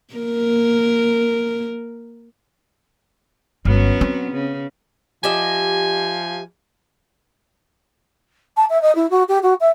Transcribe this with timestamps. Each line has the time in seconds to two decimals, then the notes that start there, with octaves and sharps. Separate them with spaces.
0.14 A#3 A#4
3.65 G1 F#3 B3 C#4
4.01 C4
4.32 C#3
5.24 F3 G4 D#5 E5 G#5
8.57 A5
8.70 E5
8.82 D#5
8.95 E4
9.10 F#4
9.28 G4
9.43 F#4
9.60 E5